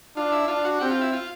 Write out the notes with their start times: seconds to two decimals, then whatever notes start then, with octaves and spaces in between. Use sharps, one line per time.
0.16 D4 F4
0.32 E4
0.48 D4 F4
0.65 F#4
0.81 C4 G4
0.90 F4
1.01 E4
1.13 F4